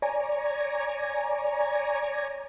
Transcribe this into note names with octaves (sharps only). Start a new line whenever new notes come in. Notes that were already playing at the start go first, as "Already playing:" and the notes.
C#5 D5 G#5 A#5